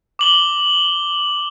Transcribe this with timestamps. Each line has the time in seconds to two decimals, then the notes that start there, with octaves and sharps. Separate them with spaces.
0.19 D6 F#7 G7